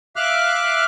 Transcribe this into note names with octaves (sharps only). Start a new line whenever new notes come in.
E5 F5 D6 F6 F#6